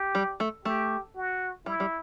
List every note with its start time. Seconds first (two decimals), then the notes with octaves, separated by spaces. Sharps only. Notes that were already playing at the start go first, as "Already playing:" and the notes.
Already playing: G4
0.15 G3
0.40 A3
0.65 A3 G4
1.16 F#4
1.66 G3 E4
1.80 G3